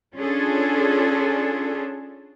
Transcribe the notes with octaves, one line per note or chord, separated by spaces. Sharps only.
C#4 D4 F4 G#4 A4